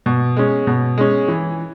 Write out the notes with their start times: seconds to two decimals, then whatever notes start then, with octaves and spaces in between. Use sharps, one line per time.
0.06 B2
0.37 G#3 C#4
0.67 B2
0.98 G#3 C#4
1.28 E3